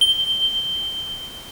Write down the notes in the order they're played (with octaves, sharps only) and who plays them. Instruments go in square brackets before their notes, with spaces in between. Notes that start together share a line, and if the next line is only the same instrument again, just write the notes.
[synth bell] G7